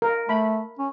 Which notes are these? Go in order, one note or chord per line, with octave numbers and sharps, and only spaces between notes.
A#4
A3 B5
C#4